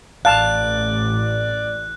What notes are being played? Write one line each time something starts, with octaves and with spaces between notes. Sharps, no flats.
A1 D5 F5 A5 F#6